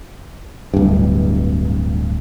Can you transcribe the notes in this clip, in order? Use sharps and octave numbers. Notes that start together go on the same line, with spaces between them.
D1 G2